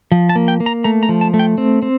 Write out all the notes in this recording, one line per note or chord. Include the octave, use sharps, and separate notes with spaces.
F3
A5
A#3
G5
A#3
A#5
A3 A#5
A#5
F3
A5
A3
G5
C4
C4